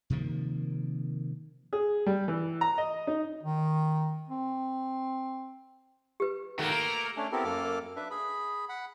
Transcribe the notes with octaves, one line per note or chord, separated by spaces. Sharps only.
C3 D#3 F3 A#3
G#4
G3
E3
A#5
D#5
D#4
D#3
C4
G4 B4
D#3 A3 A#3 F#4
A#4
A3 C#4 D4
B3 C4 E4 G4 A4 A#4
F#2 A#3 A4 D6 F6
D4 B4 E5
G#4 B5
F#5 B5